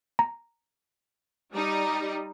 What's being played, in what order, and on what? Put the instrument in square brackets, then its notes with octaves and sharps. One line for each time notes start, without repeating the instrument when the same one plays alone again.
[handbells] A#5
[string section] G3 D#4